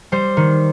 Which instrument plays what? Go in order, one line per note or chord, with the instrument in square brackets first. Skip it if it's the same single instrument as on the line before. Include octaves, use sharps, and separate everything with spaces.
[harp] G3 C5
D#3